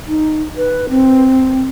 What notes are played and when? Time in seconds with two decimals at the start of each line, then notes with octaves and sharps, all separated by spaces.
0.07 D#4
0.57 B4
0.90 C4